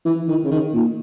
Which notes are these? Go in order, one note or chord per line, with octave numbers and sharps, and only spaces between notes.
E3
D#3
C#3
D#3
A#2